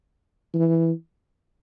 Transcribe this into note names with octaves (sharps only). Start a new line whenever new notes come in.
E3